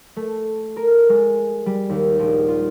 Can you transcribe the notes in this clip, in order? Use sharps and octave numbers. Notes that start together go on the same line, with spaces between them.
A3
A#4
G#3
G3
D#2
A#1
F4